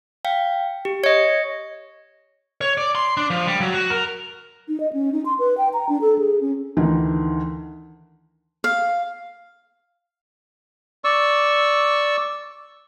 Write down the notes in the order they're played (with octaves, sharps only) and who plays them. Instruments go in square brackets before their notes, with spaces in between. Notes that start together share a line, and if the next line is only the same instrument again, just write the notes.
[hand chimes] F5 G5
G4
[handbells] C#5 D#5 [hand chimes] G#6 C#7
[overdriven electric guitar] C#5
D5
C6
D4
F3
G3
F#3
F#4
A#4
[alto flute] D#4
D#5
C#4
D#4
C6
B4
G5
A#5
D4
A4
G#4
C#4
[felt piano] D2 D#3 E3
[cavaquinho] F5
[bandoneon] D5 C#6 E6